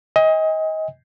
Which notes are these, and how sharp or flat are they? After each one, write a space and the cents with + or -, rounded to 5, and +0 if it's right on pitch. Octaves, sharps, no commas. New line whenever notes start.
D#5 +25 G#5 -45